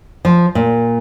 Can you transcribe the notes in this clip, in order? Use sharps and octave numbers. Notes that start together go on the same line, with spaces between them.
F3
A#2